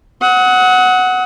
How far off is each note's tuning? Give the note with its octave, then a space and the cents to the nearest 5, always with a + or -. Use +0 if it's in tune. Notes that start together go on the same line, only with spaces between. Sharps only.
F#5 +0 D#6 +40